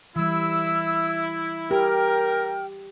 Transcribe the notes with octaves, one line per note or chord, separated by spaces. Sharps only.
E3 G3 E4 E6
G4 A#4 G5 F6